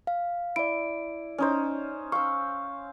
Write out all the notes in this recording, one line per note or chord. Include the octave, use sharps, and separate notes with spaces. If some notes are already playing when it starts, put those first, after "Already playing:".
F5
E4 D5 D7
C#4 D#4 C5
F5 C#6 E6